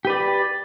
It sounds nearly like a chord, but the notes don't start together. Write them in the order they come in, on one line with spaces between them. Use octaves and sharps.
G4 B4 D5